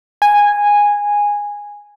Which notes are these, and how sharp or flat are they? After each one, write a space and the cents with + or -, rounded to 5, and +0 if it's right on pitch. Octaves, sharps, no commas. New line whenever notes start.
G#5 -10